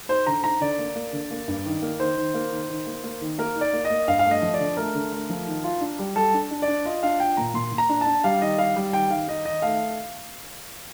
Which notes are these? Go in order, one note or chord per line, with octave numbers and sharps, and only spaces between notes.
D#4 C5
D3 A#5
D#4 A#5
D3 D5
A#3
A#3
D3
A#3
G2
D#3
A#3
D#3 C5
D#3
A#3
D#3
D#3
A#3
A#3
D#3
A#3 A#4
D#4
D5
A#3
D#5
A#3
G2 F5
F5
A3
D#5
F3
D5
D3
A3 A#4
D3
A3
F3
D#3
F4
D4
G3
G3 A4
D4
D4
D5
D4
F4 D#5
D4 F5
F4 G5
A#2 A#5
A#2 C6
A#2
A#5
D4
A5
D4
G3 F5
D#3 D#5
G3 F5
G3
D#3 G5
D#3 F5
D#4 D#5
D#3 D#5
A3 F5